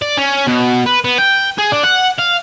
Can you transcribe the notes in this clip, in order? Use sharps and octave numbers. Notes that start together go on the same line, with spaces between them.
D5
C#4
B2
B4
B3
G5
G#4
D4
F#5
F5